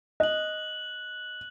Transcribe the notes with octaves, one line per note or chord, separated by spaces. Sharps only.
D#5 F#6 F#7